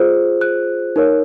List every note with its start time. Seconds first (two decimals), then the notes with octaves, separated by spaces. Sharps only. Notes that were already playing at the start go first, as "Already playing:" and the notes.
Already playing: F4 G#4 C5
0.41 F#6
0.96 D#4 A#4 C#5